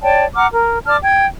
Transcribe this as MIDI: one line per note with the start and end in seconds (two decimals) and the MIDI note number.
0.02 0.24 73
0.02 0.24 74
0.02 0.24 79
0.02 0.24 81
0.35 0.46 78
0.35 0.46 82
0.35 0.46 86
0.35 0.46 89
0.51 0.77 70
0.87 0.97 74
0.87 0.97 81
0.87 0.97 86
0.87 0.97 89
1.02 1.25 79
1.02 1.25 92